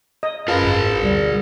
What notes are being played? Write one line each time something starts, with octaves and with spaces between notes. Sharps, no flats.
D#5
F#2 F4 G#4 A#4 B4 A5
G#1
D2 B2 G3